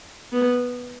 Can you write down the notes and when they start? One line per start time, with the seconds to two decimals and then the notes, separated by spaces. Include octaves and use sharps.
0.33 B3